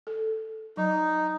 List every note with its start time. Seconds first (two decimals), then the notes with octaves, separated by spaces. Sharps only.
0.07 A4
0.77 F#3 D#4